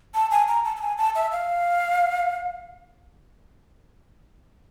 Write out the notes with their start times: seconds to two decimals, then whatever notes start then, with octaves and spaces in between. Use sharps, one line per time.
0.14 A5
0.31 G#5
0.48 A#5
0.65 A5
0.76 A5
0.81 G#5
0.98 A5
1.15 E5
1.32 F5